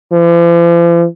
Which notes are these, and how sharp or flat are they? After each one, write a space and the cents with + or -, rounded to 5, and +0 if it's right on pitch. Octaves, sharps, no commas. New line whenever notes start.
F3 -45